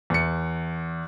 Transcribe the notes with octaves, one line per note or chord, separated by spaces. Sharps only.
E2 C#7